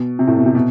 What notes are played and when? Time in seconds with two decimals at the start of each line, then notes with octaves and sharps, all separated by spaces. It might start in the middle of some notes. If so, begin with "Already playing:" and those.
Already playing: B2
0.19 C3
0.27 A2
0.36 B2
0.46 C3
0.55 B2